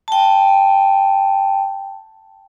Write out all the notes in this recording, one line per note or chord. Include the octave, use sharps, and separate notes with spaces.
G5 A5